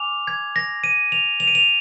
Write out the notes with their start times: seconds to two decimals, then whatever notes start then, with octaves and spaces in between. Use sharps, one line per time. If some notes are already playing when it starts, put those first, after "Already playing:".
Already playing: G#5 D6 F6 F7
0.27 G#6
0.56 A#6
0.84 D#7
1.12 F7
1.40 F7
1.47 D#7
1.55 F7